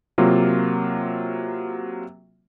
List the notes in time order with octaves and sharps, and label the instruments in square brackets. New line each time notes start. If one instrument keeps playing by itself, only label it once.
[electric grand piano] C3 F#3 A#3 F4